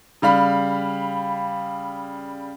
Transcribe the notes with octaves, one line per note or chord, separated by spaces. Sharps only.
C#3 G3 F5 B5